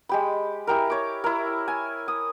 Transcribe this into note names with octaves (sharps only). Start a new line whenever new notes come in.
G#3 G4 B5
E4 G4 A#4
C#5 D6
E4 A#4
G#5
D#6